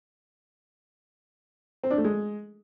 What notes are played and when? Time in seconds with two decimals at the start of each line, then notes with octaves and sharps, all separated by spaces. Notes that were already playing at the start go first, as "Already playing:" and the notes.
1.84 C4
1.90 D4
1.97 A3
2.04 G#3